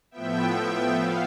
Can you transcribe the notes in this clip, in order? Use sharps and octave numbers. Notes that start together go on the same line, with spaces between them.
A2 F3 B3 E5 G5
B3 F5